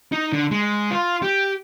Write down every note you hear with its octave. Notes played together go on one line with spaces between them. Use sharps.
D#4
D3
G#3
F4
G4